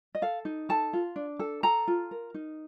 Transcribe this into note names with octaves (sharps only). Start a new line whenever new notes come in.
D#5
A4 F5
D#4
A4 A5
F4
D4
A4
A4 A#5
F4
A#4
D#4